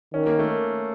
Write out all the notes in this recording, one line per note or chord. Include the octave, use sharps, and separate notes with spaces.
D#3 C#4
A#3
A3